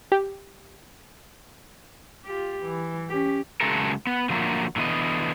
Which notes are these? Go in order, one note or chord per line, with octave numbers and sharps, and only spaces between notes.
G4
F4 G4
E3
C#4 G4
C#3 F#3 G#3 A3 A4 A#4
B3
D3 F3 F#3 A3 A#3
A2 D3 E3 B3 D#5